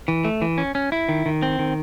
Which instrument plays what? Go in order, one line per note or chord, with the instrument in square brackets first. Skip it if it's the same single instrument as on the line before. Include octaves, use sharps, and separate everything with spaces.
[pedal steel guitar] E3
A3
E3
C#4
C#4
E4
D#3
D#3
C4
D#3